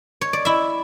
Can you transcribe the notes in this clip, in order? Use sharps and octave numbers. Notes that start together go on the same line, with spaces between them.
C#5
D5
E4 E5